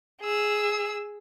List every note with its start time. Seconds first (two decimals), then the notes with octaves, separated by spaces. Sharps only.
0.21 G#4 E6